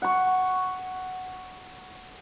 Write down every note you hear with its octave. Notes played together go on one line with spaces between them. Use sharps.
F#5 C#6